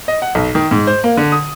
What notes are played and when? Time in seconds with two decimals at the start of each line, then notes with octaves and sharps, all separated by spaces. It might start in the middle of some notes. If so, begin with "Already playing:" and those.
0.08 D#5
0.22 F#5
0.35 B1
0.55 D#3
0.71 G#2
0.87 C5
1.04 A#3
1.17 D3
1.32 D#6